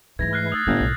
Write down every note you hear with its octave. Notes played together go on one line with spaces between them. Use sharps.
G#2 E3 A3 D#4 G#6 A#6
F6 F#6 C7
D#6 E6 A6
G1 A2 G3 A3 G6 G#6
B1